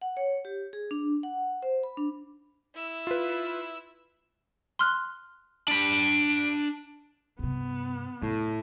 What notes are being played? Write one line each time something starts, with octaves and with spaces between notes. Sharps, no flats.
F#5
C#5
G4
G#4
D4
F#5
C5
B5
D4
E4 E6
F4 B4
C6 F6 F#6
D4 B5 D7
G2 C3 B3
F1 A2